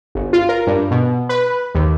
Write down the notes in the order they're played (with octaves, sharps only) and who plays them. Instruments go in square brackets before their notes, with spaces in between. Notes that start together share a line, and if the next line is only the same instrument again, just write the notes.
[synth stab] G1
F4
A#4
G2
B2
B4
D#2